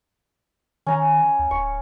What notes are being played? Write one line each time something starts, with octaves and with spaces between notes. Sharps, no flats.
D#3 C#4 A#5
D2
D1 C#6